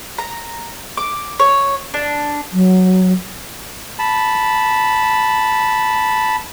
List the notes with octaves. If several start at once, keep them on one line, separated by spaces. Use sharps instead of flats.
A#5
D6
C#5
D4
F#3
A5 B5